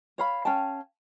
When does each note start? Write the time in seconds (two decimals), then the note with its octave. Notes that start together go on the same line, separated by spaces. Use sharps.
0.18 C#5 F5 B5
0.45 C#4 F5 G5 A5